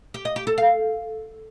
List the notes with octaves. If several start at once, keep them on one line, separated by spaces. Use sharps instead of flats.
G4
D#5
G4
A4
F5